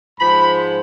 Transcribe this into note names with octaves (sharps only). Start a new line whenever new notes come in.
G#2 F3 G#3 B5